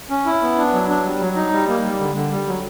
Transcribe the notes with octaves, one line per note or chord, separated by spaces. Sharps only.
C#4
E4
B3
D4
F#3
D4
G3
F#3
D#4
G3
A#3
G3
D3
D3
G3
F#3